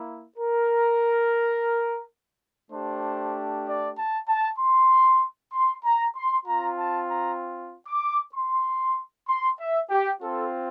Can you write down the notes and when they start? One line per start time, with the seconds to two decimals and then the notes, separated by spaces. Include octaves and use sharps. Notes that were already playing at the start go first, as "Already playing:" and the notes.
Already playing: A#3 E4
0.38 A#4
2.71 A3 D4 G4 C5
3.66 D5
3.97 A5
4.27 A5
4.59 C6
5.52 C6
5.84 A#5
6.16 C6
6.46 C4 F4 A#5
6.78 A5
7.10 A#5
7.87 D6
8.34 C6
9.28 C6
9.60 E5
9.90 G4
10.22 C4 F4 A4